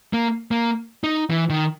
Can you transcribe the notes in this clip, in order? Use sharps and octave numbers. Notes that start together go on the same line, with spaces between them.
A#3
A#3
D#4
E3
D#3